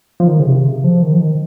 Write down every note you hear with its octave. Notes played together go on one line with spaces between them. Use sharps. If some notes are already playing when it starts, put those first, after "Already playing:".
F3
D#3
C#3
C3
C#3
F3
D#3
F3
D#3